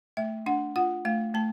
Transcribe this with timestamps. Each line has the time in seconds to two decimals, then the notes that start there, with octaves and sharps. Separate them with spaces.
0.17 A3 E5
0.46 D4 F#5
0.76 F4 F#5
1.05 A3 F5
1.34 A3 A5